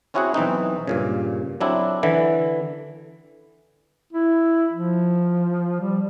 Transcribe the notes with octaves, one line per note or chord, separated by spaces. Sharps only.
C4 C#4 E4 F#4 G#4 F#5
B1 E3 C4 D#4
G2 A#2 C#3
F#3 C4 D4 E4 A4
D3 E3 E4
E4
F3
G3